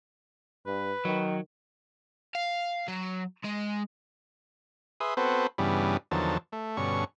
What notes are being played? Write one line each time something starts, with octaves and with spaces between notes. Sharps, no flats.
G2 B4
D#3 F#3
F5
F#3
G#3
G#4 B4 E5 C6 D#6
B3 C4 F#4 A4 B4 C5
G2 C#3 E3 G3 B3
E2 D3 D#3 F3 F#3 A5
A3
G2 B2 D3 C#4 C#6